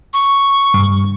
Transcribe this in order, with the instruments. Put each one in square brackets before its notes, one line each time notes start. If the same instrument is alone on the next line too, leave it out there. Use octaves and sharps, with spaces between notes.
[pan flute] C#6
[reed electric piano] G2